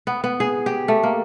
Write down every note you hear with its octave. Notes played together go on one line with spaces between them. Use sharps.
B3
B3
G#4
G4
A3
A#3